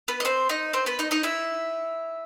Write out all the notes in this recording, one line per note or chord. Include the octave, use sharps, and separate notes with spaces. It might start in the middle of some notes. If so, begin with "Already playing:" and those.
B3 B4
D#5
C4 C5
D#4 D#5
C4 C5
B3 B4
D#4 D#5
D#4 D#5
E4 E5